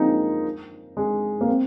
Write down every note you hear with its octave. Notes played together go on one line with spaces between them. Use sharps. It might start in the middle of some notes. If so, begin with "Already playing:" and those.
Already playing: F3 G#3 A#3 C4 D#4
G#3
A#3
C4